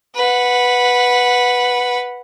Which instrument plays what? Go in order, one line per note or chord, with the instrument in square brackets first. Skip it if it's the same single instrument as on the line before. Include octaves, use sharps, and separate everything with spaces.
[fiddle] B4 F#5